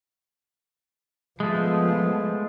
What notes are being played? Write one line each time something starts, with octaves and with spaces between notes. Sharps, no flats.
F3 G#3 A3 B3